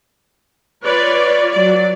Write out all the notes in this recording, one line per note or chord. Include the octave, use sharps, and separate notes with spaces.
F4 B4 C#5 D5
F#3 D5